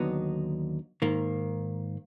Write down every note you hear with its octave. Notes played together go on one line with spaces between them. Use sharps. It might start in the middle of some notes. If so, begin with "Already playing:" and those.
Already playing: D#2 D3 F#3 B3 D#4
G#2 D#3 A#3